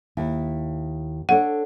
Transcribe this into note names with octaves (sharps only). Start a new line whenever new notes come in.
D#2 E4
D4 A4 C#5 F#5